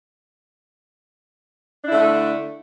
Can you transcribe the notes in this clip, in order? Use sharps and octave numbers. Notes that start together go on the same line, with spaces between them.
D3 A3 D4 E4